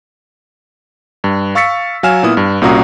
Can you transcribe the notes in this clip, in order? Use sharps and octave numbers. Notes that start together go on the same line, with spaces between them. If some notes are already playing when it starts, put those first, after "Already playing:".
G2
F5 C#6 E6 A6 B6 C#7
F#3 F5 G#5 F6 E7
A#2 B3 E4 D#6
G2
C2 A#2 C#4 F#4 A#5 D#6